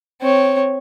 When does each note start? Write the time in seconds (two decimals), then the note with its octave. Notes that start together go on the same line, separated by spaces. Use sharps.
0.22 C4 C#5